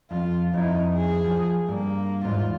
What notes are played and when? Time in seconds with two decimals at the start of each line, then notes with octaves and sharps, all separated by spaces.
0.11 F2 F4
0.54 F2 D#4 E4
0.94 G#4
1.24 F3
1.69 G2 A#3
2.25 E2 G#2 F4